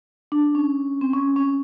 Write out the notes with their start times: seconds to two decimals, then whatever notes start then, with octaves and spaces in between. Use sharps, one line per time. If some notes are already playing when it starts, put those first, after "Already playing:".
0.32 D4
0.55 C#4
1.01 C4
1.13 C#4
1.36 C#4